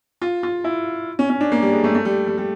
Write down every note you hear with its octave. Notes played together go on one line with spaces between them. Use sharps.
F4
F4
E4
C#4
C#4
D4
A#3
G3
G#3
A3
A3
G3
G3
G3